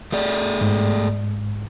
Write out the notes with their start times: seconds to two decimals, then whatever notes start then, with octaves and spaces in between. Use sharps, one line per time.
0.12 A3 G#4 D5
0.61 G#2